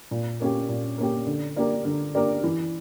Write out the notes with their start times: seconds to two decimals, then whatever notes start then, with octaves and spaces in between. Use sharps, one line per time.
0.11 A#2
0.40 A#3 C#4 G4
0.69 A#2
0.98 A#3 C#4 G4
1.27 D3
1.56 A#3 D4 G4 A#4
1.85 D3
2.15 A#3 D4 G4 A#4
2.43 E3